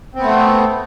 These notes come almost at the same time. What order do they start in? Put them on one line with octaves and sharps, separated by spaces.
C4 B3 A3